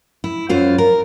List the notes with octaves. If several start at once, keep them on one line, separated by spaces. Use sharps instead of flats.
E4
F#2 F4 C5
A#4